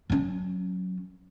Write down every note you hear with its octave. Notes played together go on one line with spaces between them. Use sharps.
F#3 C#4